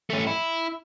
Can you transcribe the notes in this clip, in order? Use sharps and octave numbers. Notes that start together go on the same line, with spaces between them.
A3 C#4
E4